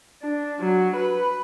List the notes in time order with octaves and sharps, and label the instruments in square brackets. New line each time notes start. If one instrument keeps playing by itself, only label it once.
[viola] D4
F#3
B4